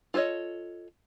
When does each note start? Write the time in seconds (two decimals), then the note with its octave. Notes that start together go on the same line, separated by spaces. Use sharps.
0.14 F4 A4 C5 C#5 D#5